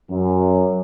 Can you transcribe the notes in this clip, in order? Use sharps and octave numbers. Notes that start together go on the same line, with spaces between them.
F#2